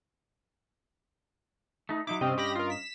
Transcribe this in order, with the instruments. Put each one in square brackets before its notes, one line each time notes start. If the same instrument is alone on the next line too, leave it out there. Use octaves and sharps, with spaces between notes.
[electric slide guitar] A3 D#4
[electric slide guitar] F#3 D#4 E4 [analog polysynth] D6
[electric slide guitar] G2 C#4 D#5 [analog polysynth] C3 C4
[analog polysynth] G4 B5 A#6
F4 A#4
B6 E7